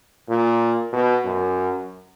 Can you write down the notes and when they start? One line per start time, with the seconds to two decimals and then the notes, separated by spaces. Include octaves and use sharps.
0.29 A#2
0.93 B2
1.25 F#2